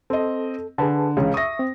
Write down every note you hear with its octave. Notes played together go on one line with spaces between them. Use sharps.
C4 A4 D#5
D3 G#4 B4 A5
C#2 C#3 E3 C#4
E5 C#6 D#6 A#6
C4